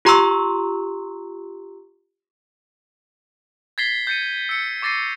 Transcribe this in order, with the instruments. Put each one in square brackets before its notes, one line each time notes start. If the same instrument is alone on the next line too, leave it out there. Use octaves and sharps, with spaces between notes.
[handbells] F4 G4 A#5 C6 C#6 E6
[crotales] G#6 A6 B6 C7 G7
G6 A6 C#7 D#7
E6 C#7
C#6 D6 A6 A#6 C7 D#7